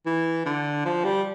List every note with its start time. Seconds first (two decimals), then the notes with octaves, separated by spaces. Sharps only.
0.06 E3
0.46 D3
0.85 F3
1.04 G3